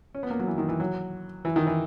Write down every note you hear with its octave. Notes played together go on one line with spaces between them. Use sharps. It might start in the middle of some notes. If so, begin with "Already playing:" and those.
C#4
B3
A#3
F#3
E3
D#3
E3
F#3
E3
D#3
E3